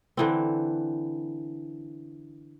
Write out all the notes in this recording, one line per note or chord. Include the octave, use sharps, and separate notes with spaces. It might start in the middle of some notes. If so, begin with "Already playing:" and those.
D3 E3 C4